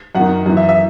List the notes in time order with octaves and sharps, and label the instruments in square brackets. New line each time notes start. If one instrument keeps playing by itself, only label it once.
[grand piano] F#2 D#3 F#5
F#2 E3
E5
E5